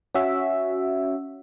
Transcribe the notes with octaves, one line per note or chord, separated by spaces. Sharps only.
C#4 F#4 E5